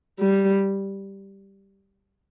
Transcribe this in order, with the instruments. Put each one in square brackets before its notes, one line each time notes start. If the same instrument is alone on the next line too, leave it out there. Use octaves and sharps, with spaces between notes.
[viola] G3